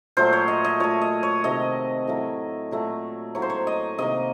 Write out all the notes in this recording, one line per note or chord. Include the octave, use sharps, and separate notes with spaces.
A#2 F#3 A3 C5
C#5
D#5
D#5
A#2 A3 C#5
D#5
C#5
C3 D#3 A3 D#5
A2 F#3 A3
A#2 F#3 A3
A2 F#3 A#3 C#5
C5
C#5
D#5
C3 D#3 A#3 D#5